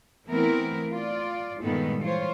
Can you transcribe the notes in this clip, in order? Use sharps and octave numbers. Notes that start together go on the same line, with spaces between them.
E3 A3 B3 C4 E4 A#4
F4 D5
G2 A#2 D#3 G#3 B3 A4
E3 F4 C5 C#5